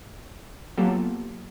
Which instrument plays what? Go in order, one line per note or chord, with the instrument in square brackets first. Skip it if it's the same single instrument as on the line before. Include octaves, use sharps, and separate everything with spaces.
[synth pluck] F#3 A#3 B3 F4 G4 A4